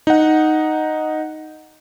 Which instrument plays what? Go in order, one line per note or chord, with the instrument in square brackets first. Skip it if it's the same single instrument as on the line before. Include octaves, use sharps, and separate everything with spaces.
[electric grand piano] D#4 F#5